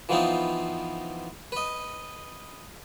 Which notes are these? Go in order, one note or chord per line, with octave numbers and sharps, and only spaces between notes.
E3 F3 B3 C4 D#4 F4
B4 D#5